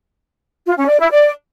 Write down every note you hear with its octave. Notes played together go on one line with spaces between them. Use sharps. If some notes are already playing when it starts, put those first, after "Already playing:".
F4
C#4
D5
E4
D5